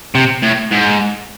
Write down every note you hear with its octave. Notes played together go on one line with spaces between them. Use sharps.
C3
A2
G#2